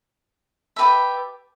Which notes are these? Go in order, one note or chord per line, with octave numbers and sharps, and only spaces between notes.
G4 B4 E5 A5